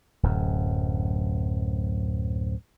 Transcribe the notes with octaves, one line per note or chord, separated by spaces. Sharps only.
D1 F#2